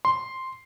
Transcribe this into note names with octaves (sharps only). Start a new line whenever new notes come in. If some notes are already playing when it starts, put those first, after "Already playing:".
C6